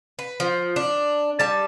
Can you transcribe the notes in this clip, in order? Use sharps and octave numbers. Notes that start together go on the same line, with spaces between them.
B4
F3
D4
G3 A5